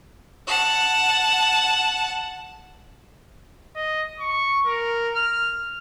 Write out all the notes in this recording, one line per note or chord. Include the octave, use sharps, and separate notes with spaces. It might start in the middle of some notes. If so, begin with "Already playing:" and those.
F#5 A5
D#5
C#6
A#4
F6